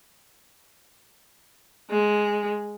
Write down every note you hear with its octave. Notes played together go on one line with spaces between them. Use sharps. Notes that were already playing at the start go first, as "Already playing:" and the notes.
G#3